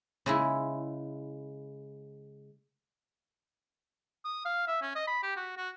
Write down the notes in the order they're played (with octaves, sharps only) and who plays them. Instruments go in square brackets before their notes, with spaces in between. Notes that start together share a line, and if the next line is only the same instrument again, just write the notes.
[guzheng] C#3 G#3 E4
[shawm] D#6
F5
E5
C#4
D#5
B5
G4
F#4
F#4